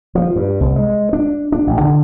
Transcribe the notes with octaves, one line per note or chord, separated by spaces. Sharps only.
F3
G2
C2
G#3
D4
D4
A1
D3